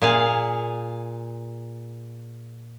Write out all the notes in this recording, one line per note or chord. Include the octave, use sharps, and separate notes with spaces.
A#2 G#4 F5